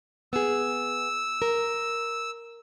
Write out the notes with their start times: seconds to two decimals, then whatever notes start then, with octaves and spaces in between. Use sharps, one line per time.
0.33 B3 G#4 E6
1.42 A#4